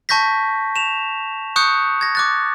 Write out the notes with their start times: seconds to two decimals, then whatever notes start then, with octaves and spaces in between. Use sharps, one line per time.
0.09 A5 C#6 G6 A#6 B6
0.76 E7 F7
1.56 C#6 D#6 F#6 G6 C#7
2.01 G#6 A#6
2.15 D6 F#6 A6